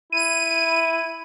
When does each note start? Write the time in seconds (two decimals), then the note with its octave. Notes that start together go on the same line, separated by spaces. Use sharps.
0.12 E4 D#7